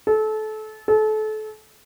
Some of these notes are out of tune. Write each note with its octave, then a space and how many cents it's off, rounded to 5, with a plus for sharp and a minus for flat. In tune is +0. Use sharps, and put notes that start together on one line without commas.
A4 -25
A4 -30